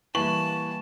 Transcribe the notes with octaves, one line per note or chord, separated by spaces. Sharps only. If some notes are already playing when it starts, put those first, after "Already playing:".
E3 G3 A#3 B4 A5 C#6 F#7